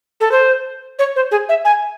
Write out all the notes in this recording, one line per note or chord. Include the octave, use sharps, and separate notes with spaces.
A4
C5
C#5
C5
G#4
E5
G#5